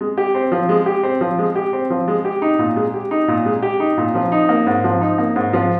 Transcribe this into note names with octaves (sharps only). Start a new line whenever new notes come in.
G#3
G4
C4
F3
G#3
G4
C4
F3
G#3
G4
C4
F3
G#3
G4
D#4
A#2
G#3
G4
D#4
A#2
G#3
G4
D#4
A#2
F3
D#4
A#3
G#2
F3
D#4
A#3
G#2
F3